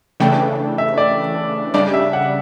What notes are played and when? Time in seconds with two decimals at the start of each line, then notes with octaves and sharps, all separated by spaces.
0.20 C#3 E3 A3 D4 G5
0.78 E5
0.98 D5
1.74 C#3 G3 D4 D5
1.94 E5
2.13 F#5